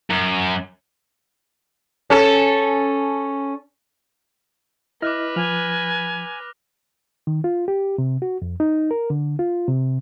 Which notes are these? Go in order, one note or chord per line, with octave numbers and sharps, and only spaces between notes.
F#2
C#4 A4
E4 B4 D#5 D6 F6 F#6 A#6
F3 G#5 F6 F7
D#3
F4
G4
C3
F#4
F2
D#4
A#4
D3
F4
C3